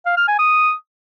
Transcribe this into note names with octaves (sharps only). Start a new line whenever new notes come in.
F5
F6
G#5
D#6